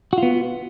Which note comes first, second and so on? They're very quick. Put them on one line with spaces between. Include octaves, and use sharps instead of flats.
F#4 F4 B3